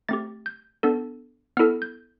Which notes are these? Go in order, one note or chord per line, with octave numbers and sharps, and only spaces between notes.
A3 C4 G4 A6
G6
B3 D4 A4
B3 E4 A4 F6
G6